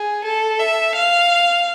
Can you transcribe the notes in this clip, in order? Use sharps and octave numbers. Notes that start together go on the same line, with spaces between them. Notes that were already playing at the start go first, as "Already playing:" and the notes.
Already playing: G#4
A4
E5
F5